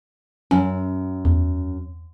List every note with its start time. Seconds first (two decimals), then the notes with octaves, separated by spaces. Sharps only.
0.51 F#2 C#4
1.25 E2